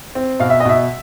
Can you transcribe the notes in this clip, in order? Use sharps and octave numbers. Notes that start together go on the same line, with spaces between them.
C4
B2 F5
E5
D#5
B2 E5